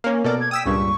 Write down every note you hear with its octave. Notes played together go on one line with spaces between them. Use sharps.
A#3 C#4
B2 A4 A#4 D5
G#6
G5 D#6 E6 B6
C#2 G2 A#2 C#6